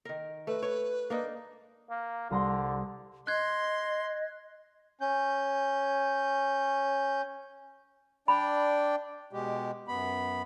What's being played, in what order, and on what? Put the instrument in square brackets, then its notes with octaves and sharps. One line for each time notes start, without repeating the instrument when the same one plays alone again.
[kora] D#3 A#4
[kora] A3 [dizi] B4
[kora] C#5
A#3 D4 D#4
[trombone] A#3
[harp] C2 A#5 C6 [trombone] D3
[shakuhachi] D#5 [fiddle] C6 [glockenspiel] F#6 G#6
[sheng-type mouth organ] C#4 G6
[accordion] D4 D5 G5 [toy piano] B5
[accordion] B2 G#3 G4
F#2 B3 B5